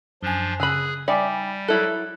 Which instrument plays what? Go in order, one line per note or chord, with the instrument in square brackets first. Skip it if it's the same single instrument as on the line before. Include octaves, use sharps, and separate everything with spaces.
[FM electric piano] F#2 G#5 [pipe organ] F3 D4 [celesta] G7
[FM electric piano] C#3 [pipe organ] G#4 [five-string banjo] G#5 B5 [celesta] E6 F#6 D#7
[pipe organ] G3 [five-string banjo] D#4 D5 E5 [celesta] G5 G#5 D6 [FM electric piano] B5
[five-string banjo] F#3 E4 A4 [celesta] E6 F#6